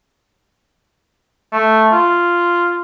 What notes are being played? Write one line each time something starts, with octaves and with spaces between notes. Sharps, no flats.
A3
F4